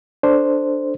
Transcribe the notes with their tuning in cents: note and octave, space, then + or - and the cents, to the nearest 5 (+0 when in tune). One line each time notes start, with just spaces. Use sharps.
D4 +0 A4 +5 C5 +0